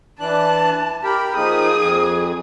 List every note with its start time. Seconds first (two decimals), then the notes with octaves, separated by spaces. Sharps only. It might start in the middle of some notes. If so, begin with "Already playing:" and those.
0.20 E3 D4 A5 F#6
1.04 G4 A#4 B5
1.36 F3 A#3 D#4 G#4 D#6
1.79 F2